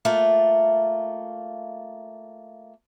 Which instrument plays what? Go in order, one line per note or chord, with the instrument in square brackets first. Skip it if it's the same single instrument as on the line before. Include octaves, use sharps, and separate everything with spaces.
[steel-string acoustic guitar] A3 A#3 F4